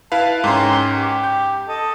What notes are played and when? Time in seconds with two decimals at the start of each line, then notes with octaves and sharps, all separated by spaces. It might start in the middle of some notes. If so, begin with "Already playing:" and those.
0.12 E4 B4 F5 A5
0.44 G#2 C#4 A#4 G5 C6
0.95 G4
1.24 G6
1.68 A4 D#5